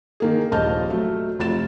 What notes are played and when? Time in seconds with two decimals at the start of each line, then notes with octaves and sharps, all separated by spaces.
0.20 D#3 A#3 G#4
0.52 D#1 A#1 D#5 A5 F6 G6
0.90 F#3 A3
1.39 F1 F4 A6 E7